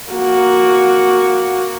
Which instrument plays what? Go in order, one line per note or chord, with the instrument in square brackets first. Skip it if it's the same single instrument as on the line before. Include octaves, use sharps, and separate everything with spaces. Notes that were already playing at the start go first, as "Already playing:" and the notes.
[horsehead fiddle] A#3 F#4